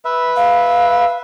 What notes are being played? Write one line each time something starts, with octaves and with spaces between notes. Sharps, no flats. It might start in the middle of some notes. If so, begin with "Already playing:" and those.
B4 E5
F5